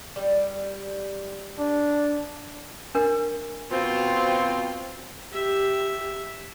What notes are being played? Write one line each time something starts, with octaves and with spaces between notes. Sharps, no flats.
G3
D4
D4 A#4
B2 C4 F4 F#4
G4 E5